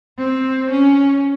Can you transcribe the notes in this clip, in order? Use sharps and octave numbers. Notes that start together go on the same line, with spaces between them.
C4
C#4